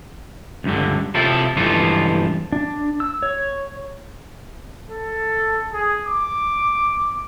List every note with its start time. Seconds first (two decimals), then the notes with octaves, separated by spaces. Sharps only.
0.64 C#2 G2 D3
1.15 C3 C4 E4 F4 A4
1.57 C#2 G2 E3 F3 F4 A4
2.52 D4
3.00 E6
3.23 C#5
4.90 A4
5.72 G#4
6.07 D6